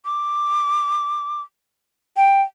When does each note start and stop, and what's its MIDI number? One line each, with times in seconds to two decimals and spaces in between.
0.05 1.41 86
2.17 2.42 79